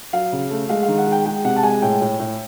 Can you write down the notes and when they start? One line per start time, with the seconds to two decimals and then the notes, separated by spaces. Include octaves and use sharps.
0.13 F#3 F5
0.32 C#3
0.50 A3
0.69 G#3 F5
0.83 F5
0.88 D#3
0.98 F#5
1.07 G#3
1.12 G5
1.26 G#3 G5
1.44 C3 F#5
1.56 A5
1.63 G#3 G#5
1.82 A2 G5
2.01 A2
2.19 A2